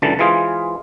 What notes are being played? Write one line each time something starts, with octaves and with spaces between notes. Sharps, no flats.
C#2 F#2 D3 E3 A5
E3 G#3 F4 G#4 C5 F5